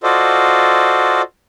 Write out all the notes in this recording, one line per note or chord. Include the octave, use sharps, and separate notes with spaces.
F4 F#4 A4 C5 D5 D#5